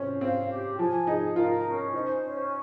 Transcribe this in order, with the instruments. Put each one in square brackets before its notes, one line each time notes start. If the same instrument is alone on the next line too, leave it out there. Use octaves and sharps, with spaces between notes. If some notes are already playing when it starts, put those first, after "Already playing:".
Already playing: [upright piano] C4 C#4
[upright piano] C4 [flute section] F5
[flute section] G4
[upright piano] F3 [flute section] G#5
[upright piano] D#4 [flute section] G#4
[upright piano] F4 [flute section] A#4
[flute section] C#4
[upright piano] D#4 [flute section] C5
[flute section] C#4